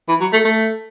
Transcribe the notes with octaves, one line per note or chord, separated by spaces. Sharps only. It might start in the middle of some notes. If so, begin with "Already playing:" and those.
E3
F#3
A3
A3